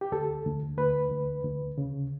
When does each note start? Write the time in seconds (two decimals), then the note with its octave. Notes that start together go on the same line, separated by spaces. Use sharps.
0.01 G4
0.12 D2 A4
0.45 D2
0.78 D2 B4
1.11 D2
1.44 D2
1.78 C#3